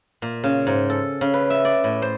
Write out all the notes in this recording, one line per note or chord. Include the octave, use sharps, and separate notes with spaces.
A#2
C#3
G#2
A4
C#3
B4
E5
D5
A2
C5